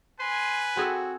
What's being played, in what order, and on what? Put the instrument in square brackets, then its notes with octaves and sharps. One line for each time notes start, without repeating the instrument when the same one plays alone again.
[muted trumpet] B4 [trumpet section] G#5 [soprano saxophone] C6
[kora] C4 G#4 A4 [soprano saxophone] F#4